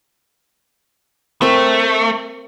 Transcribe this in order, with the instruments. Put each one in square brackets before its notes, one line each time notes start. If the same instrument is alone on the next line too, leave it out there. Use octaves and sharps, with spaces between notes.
[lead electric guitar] A3 [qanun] C4 A#4